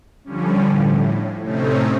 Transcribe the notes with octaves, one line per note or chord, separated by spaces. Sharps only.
D3 F3 G3 C#4
A2
A2 C3 A3 C4 C#4 D#4